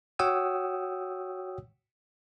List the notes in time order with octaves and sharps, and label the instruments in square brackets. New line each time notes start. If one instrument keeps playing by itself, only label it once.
[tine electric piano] F#4 C#5 F#5 G5 D#6 E6